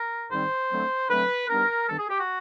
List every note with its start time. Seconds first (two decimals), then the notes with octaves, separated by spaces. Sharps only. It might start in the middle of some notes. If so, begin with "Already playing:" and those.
Already playing: A#4
0.30 G#2 D#3 G3 C4 D#4 C5
0.70 D3 F#3 A3 C4
1.10 D3 F#3 A3 C4 B4
1.49 G2 D#3 G3 B3 D4 A#4
1.89 G2 D#3 G3 B3 D4 A4
1.98 G#4
2.09 G4
2.19 F#4